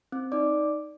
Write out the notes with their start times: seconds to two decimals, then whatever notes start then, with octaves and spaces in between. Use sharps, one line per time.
0.12 C4
0.32 D#4 D5 D6